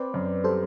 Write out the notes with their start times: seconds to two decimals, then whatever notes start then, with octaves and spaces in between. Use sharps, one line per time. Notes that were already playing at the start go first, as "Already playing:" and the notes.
Already playing: C4 B4 D5
0.14 F#2
0.44 G3 A4 C5